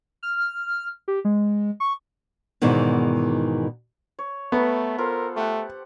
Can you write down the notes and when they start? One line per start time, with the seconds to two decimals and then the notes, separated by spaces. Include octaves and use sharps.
0.23 F6
1.08 G4
1.25 G#3
1.80 C#6
2.62 E2 G#2 B2 D#3 E3
4.19 C#5
4.52 A3 B3 A#5 B5
4.98 F4 A4 A#4 C5
5.36 A3 G4 F#5